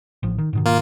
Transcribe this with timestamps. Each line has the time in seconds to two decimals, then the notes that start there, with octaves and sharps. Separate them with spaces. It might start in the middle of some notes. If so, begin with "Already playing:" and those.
0.23 A1 F3
0.38 D#3
0.53 G#2 B2 D#3
0.66 A#3 F4